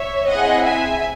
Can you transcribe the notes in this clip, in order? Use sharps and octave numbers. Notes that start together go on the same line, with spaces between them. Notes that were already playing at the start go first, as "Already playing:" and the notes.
Already playing: C#5 E5
C4 E4 G#4 D#5 F#5
E5 G#5